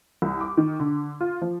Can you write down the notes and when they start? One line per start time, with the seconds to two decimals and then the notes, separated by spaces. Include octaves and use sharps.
0.22 C2
0.41 D6
0.57 D#3
0.80 D3
1.21 F4
1.42 F3